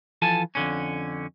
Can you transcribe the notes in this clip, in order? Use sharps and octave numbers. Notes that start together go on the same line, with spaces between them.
E3 F3 A4 G#5 A5
F2 D3 C#4